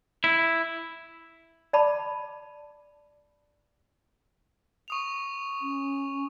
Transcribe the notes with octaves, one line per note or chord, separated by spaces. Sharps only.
E4
D5 A5 B5 D6
C#6 D#6 F7
C#4